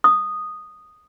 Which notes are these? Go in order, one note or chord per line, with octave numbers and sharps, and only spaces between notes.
D#6